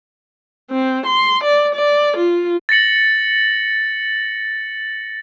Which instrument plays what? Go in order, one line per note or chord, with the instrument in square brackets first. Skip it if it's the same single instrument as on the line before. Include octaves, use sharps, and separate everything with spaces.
[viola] C4
C6
D5
D5
F4
[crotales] A6 A#6 C#7 F#7